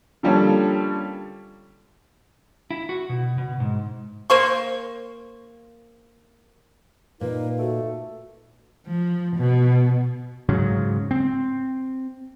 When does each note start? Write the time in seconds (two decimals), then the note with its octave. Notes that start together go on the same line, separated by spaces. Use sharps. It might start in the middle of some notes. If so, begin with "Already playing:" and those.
0.23 D3 F3 G3 A#3 C#4 A4
2.71 E4
2.89 F#4
3.09 B2
3.38 B2
3.60 G#2
4.30 A#3 C5 C#6
7.21 A#2 A#3 D#4 B4
7.59 A3 F#4
8.87 F3
9.36 B2
10.49 G#2 C#3 F#3
11.11 C4